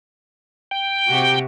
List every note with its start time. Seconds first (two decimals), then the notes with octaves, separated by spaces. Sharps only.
0.71 G5
1.08 C3 F#4 G4